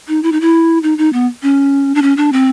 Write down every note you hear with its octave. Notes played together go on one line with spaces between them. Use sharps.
D#4
E4
D#4
E4
D#4
D#4
B3
C#4
D4
C#4
D4
C4